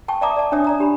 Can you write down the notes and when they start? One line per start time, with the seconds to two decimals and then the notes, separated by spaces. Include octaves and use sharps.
0.08 G5 A5 C#6
0.21 D5 E5 A5 A#5 D6 D#6
0.37 D5 A5
0.52 D4 C#5 E5 D#6
0.65 D5 A#5 D#6
0.79 D4 G4 B5